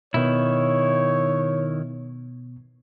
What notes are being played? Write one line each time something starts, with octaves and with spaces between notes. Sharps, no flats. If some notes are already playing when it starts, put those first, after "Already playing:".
B2 D#3 B3 E4 C#5